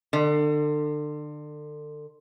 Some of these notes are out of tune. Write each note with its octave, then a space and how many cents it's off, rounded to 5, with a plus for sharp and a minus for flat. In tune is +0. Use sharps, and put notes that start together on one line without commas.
D3 +30